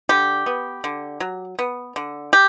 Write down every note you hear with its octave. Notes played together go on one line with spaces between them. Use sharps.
D3 G4
B3
D3
F#3
B3
D3
G4